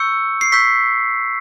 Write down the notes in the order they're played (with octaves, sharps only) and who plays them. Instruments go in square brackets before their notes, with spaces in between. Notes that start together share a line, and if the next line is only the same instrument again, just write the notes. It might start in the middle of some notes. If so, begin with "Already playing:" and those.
Already playing: [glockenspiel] C#6 E6 G6 C#7
C7
C#6 E6 G6 B6